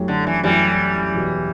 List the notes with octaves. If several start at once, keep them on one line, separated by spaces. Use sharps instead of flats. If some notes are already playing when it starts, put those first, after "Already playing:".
Already playing: F#2 F#3 A3 E4 G4
D3
E3
F#2 E3 F#3 G3 A3 E4 G4
E2 B2 F#3